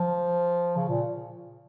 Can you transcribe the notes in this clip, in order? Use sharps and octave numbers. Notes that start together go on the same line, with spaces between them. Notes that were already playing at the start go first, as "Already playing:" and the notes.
Already playing: F3
C#3
A#2